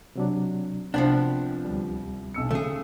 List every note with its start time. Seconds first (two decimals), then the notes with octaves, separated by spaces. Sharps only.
0.16 C3 F#3 D4
0.94 C2 F3 B3 D4 F#5 G5 A5
1.65 D2 G3
2.34 B1 E6 C#7
2.51 C#3 A3 G#4